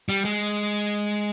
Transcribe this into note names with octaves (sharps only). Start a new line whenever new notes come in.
G3
G#3